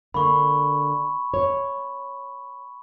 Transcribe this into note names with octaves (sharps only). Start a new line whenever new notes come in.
D3 A#3 B5 C#6
C#5